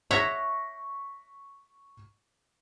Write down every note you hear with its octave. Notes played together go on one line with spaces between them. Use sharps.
C#5 E5 F#5 C#6 A#6 B6